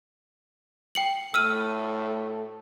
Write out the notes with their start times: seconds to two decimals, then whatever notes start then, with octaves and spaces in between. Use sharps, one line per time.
0.95 G5 C#7 F#7
1.34 A2 A3 E6 F6 D#7